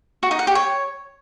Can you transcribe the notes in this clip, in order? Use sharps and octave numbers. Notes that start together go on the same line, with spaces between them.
F#4
D#4
F#5
G4
C#5